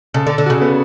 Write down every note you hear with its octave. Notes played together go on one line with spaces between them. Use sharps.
C#3 A4
D3
A4
D3
C#3 F#4
B3